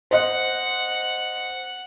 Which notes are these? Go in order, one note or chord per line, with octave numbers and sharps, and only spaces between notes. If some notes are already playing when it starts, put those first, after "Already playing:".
C5 D#5 F#5 F#6